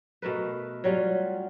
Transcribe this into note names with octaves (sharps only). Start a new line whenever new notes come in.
B2 A3 A#4 B4
F#3 G3 C#4 F4